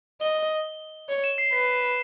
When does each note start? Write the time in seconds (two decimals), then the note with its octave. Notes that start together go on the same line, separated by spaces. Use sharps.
0.21 D#5 G7
1.09 C#5
1.24 E7
1.38 C7
1.53 B4 B6